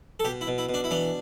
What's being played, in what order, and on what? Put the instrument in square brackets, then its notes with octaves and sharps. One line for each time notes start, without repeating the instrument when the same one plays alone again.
[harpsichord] A4
B2 G4
E4
B2
E4
B2
D4
E4
E3 D4